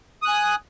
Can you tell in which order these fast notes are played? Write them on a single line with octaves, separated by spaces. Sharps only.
D#6 F#6 G#5